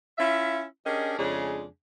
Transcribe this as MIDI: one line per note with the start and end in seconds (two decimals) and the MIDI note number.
0.18 0.63 61
0.18 0.63 64
0.18 0.63 65
0.18 0.63 76
0.85 1.14 61
0.85 1.14 62
0.85 1.14 67
0.85 1.14 68
0.85 1.14 70
0.85 1.14 75
1.18 1.66 41
1.18 1.66 49
1.18 1.66 56
1.18 1.66 62
1.18 1.66 68